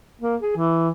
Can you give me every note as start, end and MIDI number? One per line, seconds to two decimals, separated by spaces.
0.21 0.36 58
0.41 0.54 68
0.56 0.89 52